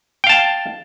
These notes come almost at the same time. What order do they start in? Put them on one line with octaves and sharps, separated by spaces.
G5 F5 A5